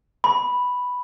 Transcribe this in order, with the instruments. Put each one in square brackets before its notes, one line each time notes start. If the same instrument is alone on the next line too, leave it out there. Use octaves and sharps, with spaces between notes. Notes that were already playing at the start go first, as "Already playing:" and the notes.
[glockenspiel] B5